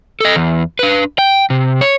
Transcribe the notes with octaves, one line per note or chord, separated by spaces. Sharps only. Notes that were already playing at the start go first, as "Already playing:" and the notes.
A4 D#5
E2
D4 B4
G5
C3
C#5